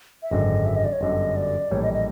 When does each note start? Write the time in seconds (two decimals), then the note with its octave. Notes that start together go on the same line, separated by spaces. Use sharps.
0.23 E5
0.31 G#1 F#2 D3 D#5
0.66 E5
0.76 D#5
0.85 D5
0.93 C#5
1.01 G1 F#2 D3 D#5
1.36 D5
1.71 A#1 A2 E3 G3 C#5
1.83 D#5
1.94 D#5